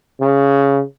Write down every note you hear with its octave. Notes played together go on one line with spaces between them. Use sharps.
C#3